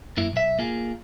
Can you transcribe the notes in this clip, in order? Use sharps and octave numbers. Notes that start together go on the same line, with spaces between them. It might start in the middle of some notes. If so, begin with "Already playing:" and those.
F#2 A#3 E4
B1 E5
A#3 F4 G#4